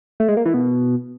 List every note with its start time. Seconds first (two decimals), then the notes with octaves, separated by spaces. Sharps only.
0.20 A3
0.28 G#3
0.37 A#3
0.45 E3
0.54 B2